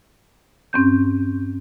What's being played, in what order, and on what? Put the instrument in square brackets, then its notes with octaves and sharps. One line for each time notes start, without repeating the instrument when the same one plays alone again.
[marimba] G2 C4 C#4 G6